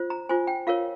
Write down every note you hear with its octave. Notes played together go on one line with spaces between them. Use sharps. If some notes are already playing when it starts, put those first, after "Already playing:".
Already playing: F4 C5
A#5
F4 C5 G#5
G5
F4 A#4 C#5 F5